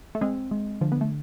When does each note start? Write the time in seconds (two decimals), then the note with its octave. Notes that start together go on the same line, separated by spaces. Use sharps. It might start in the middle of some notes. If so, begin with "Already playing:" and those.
0.15 A3
0.21 G#3 C4
0.51 G#3
0.81 D3 F3
0.92 B3
1.01 A3